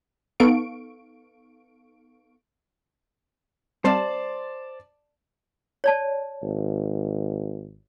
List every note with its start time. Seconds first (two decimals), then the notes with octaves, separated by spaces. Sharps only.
0.40 B3 D#4 A4 F5 C#6 D7
3.85 G3 C4 C5 D5 F5 A5
5.84 C#5 D5 A5
6.42 G#1